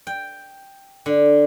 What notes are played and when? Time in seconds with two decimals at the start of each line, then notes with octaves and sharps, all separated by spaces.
0.07 G5
1.06 D3